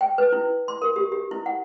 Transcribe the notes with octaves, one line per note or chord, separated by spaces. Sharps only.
G5
B4
E4
C6
A#4
G4
G4
E4
F#5